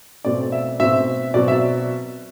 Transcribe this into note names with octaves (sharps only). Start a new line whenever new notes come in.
B2 A3 C4 D5
E5
B2 A3 C4 E5
B2 F#3 C4 D5
E5